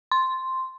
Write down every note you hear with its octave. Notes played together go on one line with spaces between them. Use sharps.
C6